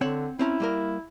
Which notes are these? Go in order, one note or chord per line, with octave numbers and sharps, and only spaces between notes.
D3 C4 C#5 F#5
C4 C#4 E4 A#5
G3 A#3 A#4